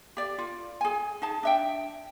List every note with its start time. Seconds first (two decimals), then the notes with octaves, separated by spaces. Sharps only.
0.17 G4 D5
0.38 F4
0.81 G#4 G#5
1.22 D#4 G#4 A5
1.43 D4 E5 G5